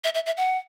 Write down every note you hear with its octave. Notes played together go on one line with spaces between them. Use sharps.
E5
E5
E5
F#5